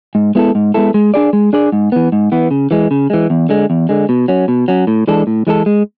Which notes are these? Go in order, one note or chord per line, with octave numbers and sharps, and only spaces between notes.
G#2
G#3 B3 E4 A4
G#2
G#3 B3 E4 A4
G#3
D4 G#4 D5
G#3
D4 G#4 D5
G#2
E3 B3
G#2
E3 B3
C#3
E3 G#3
C#3
E3 G#3
E2
D3 G#3
E2
D3 G#3
B2
F#3 C#4
B2
F#3 C#4
A2
E3 G#3 D4 A4
A2
E3 G#3 D4 A4
G#3